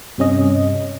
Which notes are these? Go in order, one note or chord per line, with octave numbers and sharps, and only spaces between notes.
G2 C3 C#4 D#5